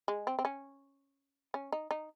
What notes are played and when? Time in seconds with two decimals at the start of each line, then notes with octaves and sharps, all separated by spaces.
0.08 G#3
0.27 C4
0.39 C4
0.45 C#4
1.54 C#4
1.72 D#4
1.91 D#4